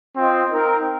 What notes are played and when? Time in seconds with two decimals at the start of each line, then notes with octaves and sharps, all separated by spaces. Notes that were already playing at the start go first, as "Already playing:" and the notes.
0.16 C4 F4 C5 D#5
0.50 C4 D#4 A#4